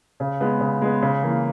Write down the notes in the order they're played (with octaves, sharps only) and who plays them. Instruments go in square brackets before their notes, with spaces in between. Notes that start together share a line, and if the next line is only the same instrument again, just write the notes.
[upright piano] C#3
G#3 B3
C#3
G#3 B3
C#3
E3 A#3